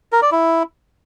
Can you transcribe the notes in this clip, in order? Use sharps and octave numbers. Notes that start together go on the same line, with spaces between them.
A#4
D5
E4